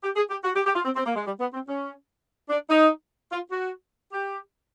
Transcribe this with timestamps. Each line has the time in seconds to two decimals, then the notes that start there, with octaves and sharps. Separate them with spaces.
0.03 G4
0.16 G#4
0.30 G4
0.44 F#4
0.55 G4
0.65 G4
0.75 F4
0.85 C4
0.96 C4
1.06 A#3
1.16 G#3
1.26 G3
1.40 B3
1.53 C4
1.68 C#4
2.49 D4
2.70 D#4
3.32 F4
3.52 F#4
4.13 G4